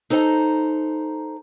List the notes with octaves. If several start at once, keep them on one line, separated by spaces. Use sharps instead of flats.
D#4 A4 C5 G#5 A#5